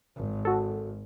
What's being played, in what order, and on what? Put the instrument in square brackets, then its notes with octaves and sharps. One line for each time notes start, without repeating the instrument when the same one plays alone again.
[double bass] G#1
[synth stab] F#4 A4